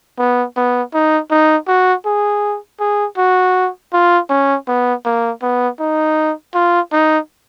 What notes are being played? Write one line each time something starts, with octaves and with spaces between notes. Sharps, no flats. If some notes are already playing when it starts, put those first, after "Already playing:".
B3
B3
D#4
D#4
F#4
G#4
G#4
F#4
F4
C#4
B3
A#3
B3
D#4
F4
D#4